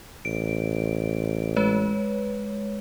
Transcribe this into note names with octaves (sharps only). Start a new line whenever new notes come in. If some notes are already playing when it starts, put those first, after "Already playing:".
A1 D7
G#3 B4 C#5